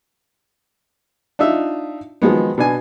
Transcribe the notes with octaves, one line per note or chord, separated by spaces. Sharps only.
D4 D#4 F4 E5
D#3 F3 F#3 G#3 B3
B2 D4 G#5